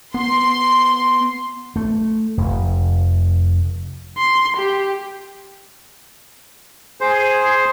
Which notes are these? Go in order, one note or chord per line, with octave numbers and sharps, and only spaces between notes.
B3 C6
A3
F1
C6
G4
G#4 C5